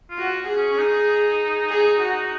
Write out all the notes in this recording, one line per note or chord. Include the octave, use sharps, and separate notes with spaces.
F4
F#4
G#4
C#4
C#4
D#4
G#4
F#4